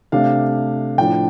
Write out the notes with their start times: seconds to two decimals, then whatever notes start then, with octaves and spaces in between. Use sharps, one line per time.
0.12 C3 A3 D4 F5
0.98 A2 F3 D4 G5